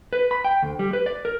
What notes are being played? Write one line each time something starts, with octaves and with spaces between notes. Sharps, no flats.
B4
B5
G5
D2
G3
B4
D5
A#4